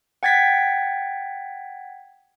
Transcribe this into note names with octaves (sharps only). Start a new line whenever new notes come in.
F#5 G5 G#6 A6 B6